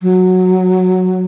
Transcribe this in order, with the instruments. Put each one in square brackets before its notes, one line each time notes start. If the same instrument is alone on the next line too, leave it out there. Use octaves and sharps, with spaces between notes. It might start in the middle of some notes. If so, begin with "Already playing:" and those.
[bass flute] F#3